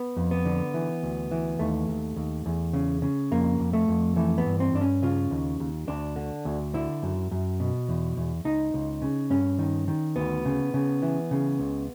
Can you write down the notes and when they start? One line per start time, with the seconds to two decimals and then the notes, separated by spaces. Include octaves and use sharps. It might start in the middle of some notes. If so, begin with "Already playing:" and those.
Already playing: B3
0.17 F2
0.31 B3
0.46 D3
0.74 E3
1.03 D2
1.31 E3
1.59 D#2 A3
1.88 D#2
2.16 D#2
2.46 E2
2.73 C#3
3.02 C#3
3.31 F2 A#3
3.60 F2
3.73 A3
3.88 F2
4.16 E3 A3
4.38 B3
4.46 G2
4.60 C4
4.73 G2 D4
4.81 C#4
5.03 C#3 F4
5.31 D#2
5.60 D#2
5.88 D2 D4
6.16 D3
6.45 D2
6.74 D3 E4
7.03 F#2
7.31 F#2
7.60 B2
7.89 E2
8.17 E2
8.44 C#2 D#4
8.74 C#2
9.02 C#3
9.30 G2 C#4
9.59 D#3
9.88 D#3
10.16 D2 B3
10.45 C#3
10.74 C#3
11.03 E3
11.31 C#3
11.59 C#2